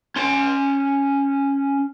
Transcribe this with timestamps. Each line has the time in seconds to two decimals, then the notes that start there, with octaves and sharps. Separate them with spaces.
0.16 C#4 C6